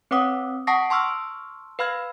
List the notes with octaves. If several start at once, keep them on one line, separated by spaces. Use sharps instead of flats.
C4 B4 C#5 F#5 D6 D#6
F#5 A5 C#6 D#6 A#6 C7
A5 C6 C#6 E6 F6
B4 F5 B5 F6 G#6